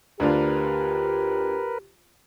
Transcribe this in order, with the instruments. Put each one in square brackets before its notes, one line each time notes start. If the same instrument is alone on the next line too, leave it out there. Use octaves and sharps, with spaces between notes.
[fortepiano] D2 D4 F4 [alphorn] G4 [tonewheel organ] A#4 B4